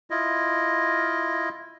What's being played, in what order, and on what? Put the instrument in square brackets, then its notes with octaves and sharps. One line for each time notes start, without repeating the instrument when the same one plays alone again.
[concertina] E4 F4 D#5